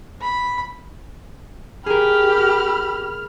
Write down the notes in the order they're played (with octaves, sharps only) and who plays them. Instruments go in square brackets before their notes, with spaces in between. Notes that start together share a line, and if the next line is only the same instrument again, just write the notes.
[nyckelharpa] B5
[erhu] G4 [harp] G#4 A#4 [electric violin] B5 F6